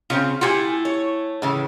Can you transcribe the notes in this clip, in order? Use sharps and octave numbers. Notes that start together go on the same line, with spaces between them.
C#3 C4 C#4 F4
A3 E4 F4 G4 F#5 G#5
C#5
A2 C#3 E3